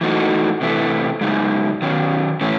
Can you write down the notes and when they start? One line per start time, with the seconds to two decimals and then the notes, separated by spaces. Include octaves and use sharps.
0.01 E3 A3 D#4 F#4
0.61 C3 E3 A3
1.21 F#2 C#3 G#3 D#4
1.82 D#3 F#3 C#4
2.41 A2 E3 A3 C#4 E4